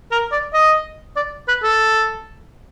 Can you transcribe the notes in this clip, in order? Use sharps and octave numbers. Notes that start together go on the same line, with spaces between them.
A#4
D5
D#5
D5
B4
A4